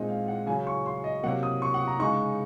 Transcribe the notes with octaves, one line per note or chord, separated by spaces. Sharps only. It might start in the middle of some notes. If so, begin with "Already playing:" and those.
Already playing: A#2 G#3 C4 D#4 D#5
F5
F#5
C#3 F#3 C#4 G#5
C#6
C6
D#5
C3 F#3 A#3 F#5
D#6
C#6
F#5
A#5
C#3 G#3 D#4 C#6